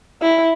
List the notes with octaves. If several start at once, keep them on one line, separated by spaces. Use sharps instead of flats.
E4